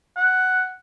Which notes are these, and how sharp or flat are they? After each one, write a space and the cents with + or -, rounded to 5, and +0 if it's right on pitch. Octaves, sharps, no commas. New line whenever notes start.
F#5 +5